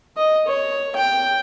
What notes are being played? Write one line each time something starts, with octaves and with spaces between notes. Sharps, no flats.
D#5
C#5
G5